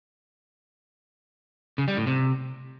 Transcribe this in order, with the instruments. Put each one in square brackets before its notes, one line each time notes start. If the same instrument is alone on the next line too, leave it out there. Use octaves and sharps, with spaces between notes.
[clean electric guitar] C#3
G3
A2
C3